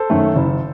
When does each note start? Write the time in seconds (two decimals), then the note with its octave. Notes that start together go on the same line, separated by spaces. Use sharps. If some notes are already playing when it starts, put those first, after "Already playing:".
Already playing: A4 C5
0.10 F#2 D#3 A3
0.36 F#1